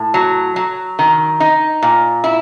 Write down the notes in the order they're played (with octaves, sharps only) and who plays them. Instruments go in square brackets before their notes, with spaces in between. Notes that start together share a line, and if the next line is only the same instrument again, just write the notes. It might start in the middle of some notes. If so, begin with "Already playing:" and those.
Already playing: [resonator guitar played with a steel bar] A2
F#3
F#3
D#3
D#4
A#2
E4